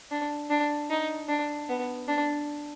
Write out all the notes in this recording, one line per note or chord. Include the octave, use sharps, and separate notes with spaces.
D4
D4
D#4
D4
B3
D4